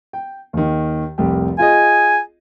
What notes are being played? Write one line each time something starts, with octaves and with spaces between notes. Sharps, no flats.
G5
D#2 D#3
F1 C2 G4
F4 G#4 D#5 G#5